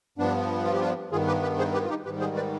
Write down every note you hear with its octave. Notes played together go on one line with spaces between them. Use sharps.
G2 F3 B3 D4
F4
G4
D4 F4
G2 D#3 B3 F4 G#4
G4 B4
G4 B4
G#4 C5
G4 B4
F4
D#4 G4
G#2 D#3 G3 G4 B4
G#4 C5
B4 D5